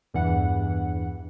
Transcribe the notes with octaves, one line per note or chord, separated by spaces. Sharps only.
E2 G2 E3 F#5